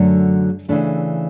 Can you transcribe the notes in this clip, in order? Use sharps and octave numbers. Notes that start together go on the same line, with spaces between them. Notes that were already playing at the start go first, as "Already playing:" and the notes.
Already playing: F#2 D3 F#3 A3
C#3 E3 A3 D4